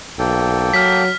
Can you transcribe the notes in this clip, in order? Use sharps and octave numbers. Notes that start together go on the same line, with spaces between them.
B1 A#3 A4 G5
F#3 F6 B6